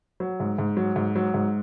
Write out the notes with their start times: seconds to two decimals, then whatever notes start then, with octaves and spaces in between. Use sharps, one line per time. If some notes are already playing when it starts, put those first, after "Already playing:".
0.20 F#3
0.40 G#2
0.58 G#2
0.77 F#3
0.96 G#2
1.16 F#3
1.34 G#2